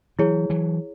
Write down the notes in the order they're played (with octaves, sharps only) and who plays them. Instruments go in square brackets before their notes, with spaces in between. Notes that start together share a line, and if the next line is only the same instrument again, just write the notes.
[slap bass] E3 F#3 [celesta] E4 G#4 C#5
[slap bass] E3 F#3